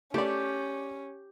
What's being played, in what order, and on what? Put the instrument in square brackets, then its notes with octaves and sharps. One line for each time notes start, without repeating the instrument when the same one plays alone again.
[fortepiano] A3 D5 [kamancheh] C#4 [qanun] G4